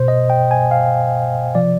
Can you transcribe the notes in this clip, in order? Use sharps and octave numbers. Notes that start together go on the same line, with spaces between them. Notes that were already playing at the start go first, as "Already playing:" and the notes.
Already playing: B2 C5
D#5
G5
G#5
F5
C3 F3 D5